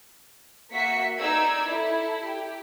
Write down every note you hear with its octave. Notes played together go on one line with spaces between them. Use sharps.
A#3 F#4 E5 B6 C#7
D#4 D5 E6 G#6
E4 A4
G4